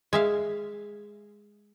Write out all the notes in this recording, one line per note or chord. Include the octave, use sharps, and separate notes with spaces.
G#3 E5 F5